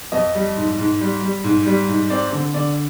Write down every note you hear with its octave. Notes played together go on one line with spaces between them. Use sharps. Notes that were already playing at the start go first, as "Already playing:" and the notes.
F2 D#5
G3
G#2
G#2
G3
G3
G#2
G3
G#2
C4 D5
D3
D3 D5